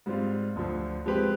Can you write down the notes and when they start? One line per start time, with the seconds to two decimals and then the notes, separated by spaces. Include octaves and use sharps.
0.06 G#2 G3 C4 F4
0.56 D2 D3 F3
1.06 F3 G#3 C4 G4 B4